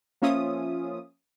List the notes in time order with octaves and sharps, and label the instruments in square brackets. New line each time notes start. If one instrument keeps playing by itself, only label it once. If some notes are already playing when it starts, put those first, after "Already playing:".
[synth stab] F3 A#3 C#4 F4 E5 D#6